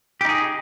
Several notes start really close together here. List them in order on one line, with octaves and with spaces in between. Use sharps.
G4 D#4 G#4